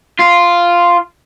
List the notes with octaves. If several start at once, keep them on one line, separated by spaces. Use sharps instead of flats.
F4